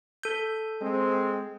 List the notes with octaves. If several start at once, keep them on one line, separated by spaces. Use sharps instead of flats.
A4 G6
G#3 C4